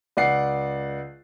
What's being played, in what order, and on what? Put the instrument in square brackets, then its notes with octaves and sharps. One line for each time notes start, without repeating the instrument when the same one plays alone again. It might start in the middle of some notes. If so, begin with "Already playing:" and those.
[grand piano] C#2 D5 F#5 C7